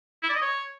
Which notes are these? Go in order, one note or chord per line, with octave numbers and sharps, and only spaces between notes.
E4
D5
D#5
C#5